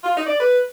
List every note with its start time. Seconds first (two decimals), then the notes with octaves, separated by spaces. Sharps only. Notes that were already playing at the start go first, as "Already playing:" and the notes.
0.04 F4
0.16 D#4
0.27 D5
0.39 B4